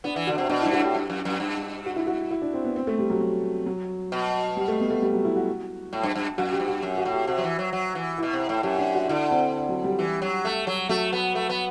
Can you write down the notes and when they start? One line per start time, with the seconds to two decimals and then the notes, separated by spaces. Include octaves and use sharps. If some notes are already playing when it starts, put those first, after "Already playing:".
0.04 B3 D4
0.16 E3
0.27 D3 F#4
0.38 C3
0.49 B2 D4
0.61 E4
0.65 G2
0.72 F#4
0.79 A2 G4
0.95 G2
1.10 F#2
1.25 F#2
1.40 G2
1.86 F#4
1.96 E4
2.07 F#4
2.31 E4
2.42 D4
2.54 C4
2.65 B3
2.76 C4
2.87 A3
2.99 G3
3.10 F#3
3.21 F#3
3.66 F#3
4.12 B2
4.57 G3
4.68 A3
4.80 B3
4.90 A3
5.02 G3
5.14 F#3
5.25 E4
5.36 F#4
5.93 A2
6.03 G2
6.15 G2
6.38 F#2 F#4
6.52 G4
6.60 G2
6.68 F#4
6.83 F#2
6.98 F#4
7.05 A2
7.13 G4
7.27 C3 F#4
7.38 F#3
7.44 E3
7.59 F#3
7.73 F#3
7.95 E3
8.18 B2 E4
8.33 C3
8.49 A2
8.63 F#2 G4
8.79 D4
8.94 F#4
9.09 D3 E4
9.31 C4
9.69 F#3
9.84 G3
9.99 E3
10.22 F#3
10.45 A3
10.67 F#3
10.89 F#3 A3
11.13 B3
11.35 A3
11.49 B3